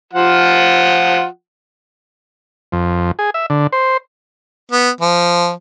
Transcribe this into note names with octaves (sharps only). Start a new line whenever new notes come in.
F3 F4 F#5
F2
G#4
E5
D3
C5
B3
F3